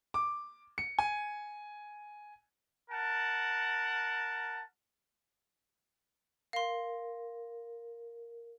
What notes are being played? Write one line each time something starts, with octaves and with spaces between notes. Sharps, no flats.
D6
C#7
G#5
A#4 F#5 A5
A#4 F5 C6